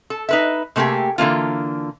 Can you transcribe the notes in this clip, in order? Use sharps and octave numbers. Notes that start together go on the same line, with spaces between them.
A4
D#4 B4 E5
C3 A3 A#3 G4 G#4
D3 E3 A#3 F4